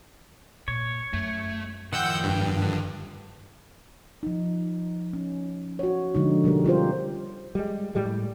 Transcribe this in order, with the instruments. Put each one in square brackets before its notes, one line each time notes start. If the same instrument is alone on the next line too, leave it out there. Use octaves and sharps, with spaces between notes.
[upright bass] A#2 [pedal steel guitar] C#5
[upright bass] F#2 [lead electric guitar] A3
[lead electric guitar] A2 G5 [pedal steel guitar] D#3 F3 [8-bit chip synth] F#5 E6 G6
[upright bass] F1 [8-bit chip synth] G2
[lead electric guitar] D3
[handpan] F3 D#4
C#4
F#4 C#5
D3 F3 G#3 D#4
B2 G3 G4 A#4
C#4 F4 G4 C5
[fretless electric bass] G3 G#3
A2 G3 G#3